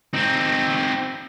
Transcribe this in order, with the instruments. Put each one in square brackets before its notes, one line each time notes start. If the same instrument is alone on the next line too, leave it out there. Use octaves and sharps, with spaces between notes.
[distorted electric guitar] C4 D#4